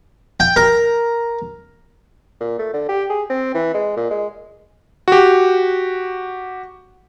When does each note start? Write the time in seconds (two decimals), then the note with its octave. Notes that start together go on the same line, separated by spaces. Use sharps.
0.40 G5
0.56 A#4
2.40 A#2
2.59 A3
2.73 D3
2.89 G4
3.10 G#4
3.30 C4
3.54 E3
3.74 G#3
3.97 A#2
4.11 G#3
5.08 F#4 G4